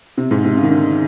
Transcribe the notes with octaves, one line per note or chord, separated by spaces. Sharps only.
C3
G#2
C3
C#3
D#3
D3